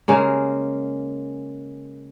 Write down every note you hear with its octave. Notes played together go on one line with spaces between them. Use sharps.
C#3 G#3 A#3